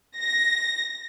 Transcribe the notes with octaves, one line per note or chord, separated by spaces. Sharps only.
A#6